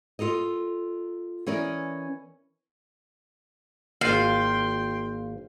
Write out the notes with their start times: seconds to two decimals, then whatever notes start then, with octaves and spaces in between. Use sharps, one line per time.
0.19 F4 A4 A#4 D#5
1.47 E3 C#4 A#4 D5 D#5
4.01 G#1 A#3 F4 F#4 F5 G5 C6